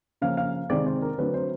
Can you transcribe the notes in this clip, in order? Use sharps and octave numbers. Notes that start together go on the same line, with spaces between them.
C#3 F3 A#3 F5
F5
C3 D#3 G#3 C4 D5
C5
A#4
D3 F#3 A3 C4 B4
C5